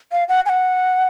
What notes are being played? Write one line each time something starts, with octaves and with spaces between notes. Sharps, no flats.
F5
F#5
G#5
F#5